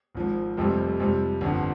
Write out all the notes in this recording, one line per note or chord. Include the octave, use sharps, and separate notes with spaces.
G#1 G#2 F3
F1 F2 C3 G3
F2 C3 G3
G1 F2 D3